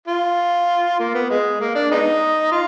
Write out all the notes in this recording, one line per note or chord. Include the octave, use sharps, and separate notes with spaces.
F4
A#3
B3
G#3
A#3
D4
G#3 B3 D#4
F4